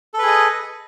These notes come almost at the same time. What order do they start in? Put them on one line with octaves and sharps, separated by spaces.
A4 B4 G#4 D#5